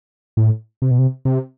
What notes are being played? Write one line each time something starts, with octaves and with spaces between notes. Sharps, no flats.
A2
C3
B2
C3
C3